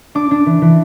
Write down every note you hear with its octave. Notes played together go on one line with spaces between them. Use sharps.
D4 D6
D4
E3
E3